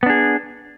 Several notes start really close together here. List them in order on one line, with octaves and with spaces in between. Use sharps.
B3 D4 G#4